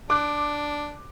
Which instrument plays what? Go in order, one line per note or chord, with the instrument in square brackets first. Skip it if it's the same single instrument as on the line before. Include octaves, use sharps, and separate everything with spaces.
[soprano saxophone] D4 [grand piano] D6 F#6